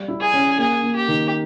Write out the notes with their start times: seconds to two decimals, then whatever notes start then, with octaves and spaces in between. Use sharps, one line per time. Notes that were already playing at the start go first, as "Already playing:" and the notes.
Already playing: G3
0.08 E4
0.21 G#4
0.33 C#4
0.58 A#3 G#4
0.83 A#3
0.96 G4
1.08 D#3